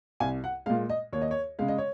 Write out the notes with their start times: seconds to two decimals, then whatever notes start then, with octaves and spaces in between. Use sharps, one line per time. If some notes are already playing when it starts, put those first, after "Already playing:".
0.20 C2 G#5
0.44 F#5
0.66 A#2 G#3 F5
0.90 D#5
1.13 D#2 C#5
1.22 D#5
1.31 C#5
1.59 C#3 G#3 F5
1.68 D#5
1.78 C#5